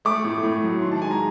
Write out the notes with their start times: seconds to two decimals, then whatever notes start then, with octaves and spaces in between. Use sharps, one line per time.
0.05 A3 D6
0.24 A2
0.43 A2
0.63 F#3
0.82 D#3 C6
0.91 A5
1.02 G#3 G#5
1.11 A#5